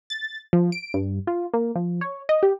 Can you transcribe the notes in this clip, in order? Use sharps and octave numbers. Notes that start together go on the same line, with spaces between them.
A6
F3
D7
G2
F4
A#3
F3
C#5
D#5
G4